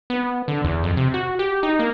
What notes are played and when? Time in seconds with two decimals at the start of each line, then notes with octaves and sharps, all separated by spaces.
0.10 B3
0.48 D3
0.64 E2
0.83 F2
0.97 C3
1.14 F#4
1.39 G4
1.63 D#4
1.79 A#3